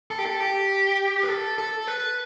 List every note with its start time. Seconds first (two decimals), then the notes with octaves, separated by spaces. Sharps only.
0.11 A4
0.18 G4
0.26 A4
0.40 G4
1.23 B4
1.28 A4
1.58 A4
1.87 B4